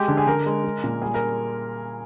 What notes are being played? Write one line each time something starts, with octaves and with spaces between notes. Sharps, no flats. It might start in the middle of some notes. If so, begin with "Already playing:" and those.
Already playing: G#3 G4
D3
G#4
D3 A#4
G#3
G#3
A#2
G3 G#4
A#4